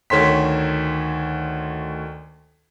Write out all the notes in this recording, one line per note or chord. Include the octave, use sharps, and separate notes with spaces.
D2 D#3 C#5 C6 B6